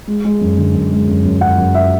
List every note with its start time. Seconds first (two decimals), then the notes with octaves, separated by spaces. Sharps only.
0.07 G#3
0.25 G#3
0.41 F#2
0.58 D3
0.74 F#2
0.92 G#3
1.08 F#2
1.25 F#2
1.41 F#2 F#5
1.58 F#2
1.74 E5